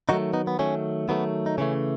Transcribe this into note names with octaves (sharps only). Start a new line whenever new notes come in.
D#3 F#3 A3 D#4 F#4
B3 D#4
B3
D#3 F#3 A3 C#4
D#3 F#3 A3 B3
D#4
C#3 E3 A3 C#4